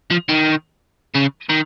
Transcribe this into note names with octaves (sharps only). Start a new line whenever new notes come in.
F3
D#3
C#3
D#3